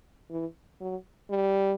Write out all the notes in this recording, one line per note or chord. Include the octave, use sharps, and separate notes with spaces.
E3
F#3
G3